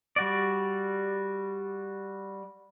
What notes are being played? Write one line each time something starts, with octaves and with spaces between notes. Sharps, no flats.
G3 F#4 D5